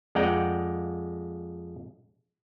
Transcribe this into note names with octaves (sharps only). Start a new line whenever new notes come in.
F2 G#3 D5 F#5 G5 A#5